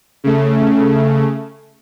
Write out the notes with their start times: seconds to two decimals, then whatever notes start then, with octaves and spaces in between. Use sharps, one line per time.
0.24 C#3 A3